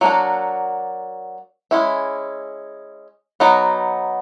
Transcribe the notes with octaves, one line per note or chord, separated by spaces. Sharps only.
F#3 A#3 D4 F#4
G#3 C#4 E4
F#3 B3 D#4